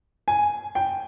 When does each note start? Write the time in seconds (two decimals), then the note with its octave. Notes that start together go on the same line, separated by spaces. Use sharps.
0.28 G#5
0.75 G5